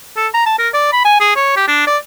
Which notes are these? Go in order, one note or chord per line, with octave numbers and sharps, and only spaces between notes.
A4
A#5
A5
A#4
D5
B5
G#5
G#4
C#5
G4
D4
D5